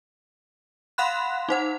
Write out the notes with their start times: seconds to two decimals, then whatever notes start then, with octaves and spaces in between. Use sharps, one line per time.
0.98 F5 F#5 B5 C6 F#6
1.49 D#4 C5 F#5